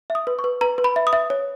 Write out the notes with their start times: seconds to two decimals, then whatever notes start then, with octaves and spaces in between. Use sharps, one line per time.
0.10 E5
0.15 D#6
0.27 B4
0.39 C#6
0.44 B4
0.61 B4 A#5
0.78 B4
0.84 B5
0.96 E5
1.07 D#6
1.13 E5
1.30 C#5